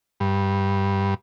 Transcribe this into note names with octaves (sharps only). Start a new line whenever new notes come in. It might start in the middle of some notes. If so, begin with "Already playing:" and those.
G2